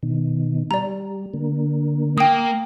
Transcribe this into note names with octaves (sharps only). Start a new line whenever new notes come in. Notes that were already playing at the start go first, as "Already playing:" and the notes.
B2 D#3
G3 D5 A#5
D3 A#3
A#3 G5 D#6